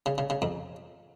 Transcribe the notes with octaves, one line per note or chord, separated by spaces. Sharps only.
C#3
C#3
C#3
F2